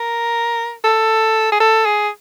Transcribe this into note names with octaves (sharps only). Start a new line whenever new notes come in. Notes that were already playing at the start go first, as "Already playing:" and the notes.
Already playing: A#4
A4
G#4
A4
G#4